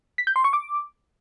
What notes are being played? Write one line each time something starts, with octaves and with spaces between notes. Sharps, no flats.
B6
G6
C6
C#6
D6